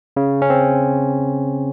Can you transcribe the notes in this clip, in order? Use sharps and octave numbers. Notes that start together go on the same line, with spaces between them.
C#3
C#4
C4